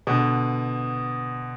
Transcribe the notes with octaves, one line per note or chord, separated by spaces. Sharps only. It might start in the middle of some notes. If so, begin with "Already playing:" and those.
B2 D3